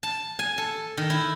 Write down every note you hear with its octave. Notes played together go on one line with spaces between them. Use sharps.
A5
G#5
A4
D#3
E4